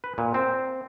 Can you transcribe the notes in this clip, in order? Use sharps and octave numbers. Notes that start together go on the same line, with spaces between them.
B4
A#2
C4